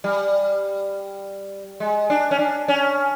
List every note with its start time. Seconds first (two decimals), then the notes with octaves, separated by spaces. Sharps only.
0.04 G3
1.80 G#3
2.10 D4
2.31 C#4
2.39 D4
2.68 C#4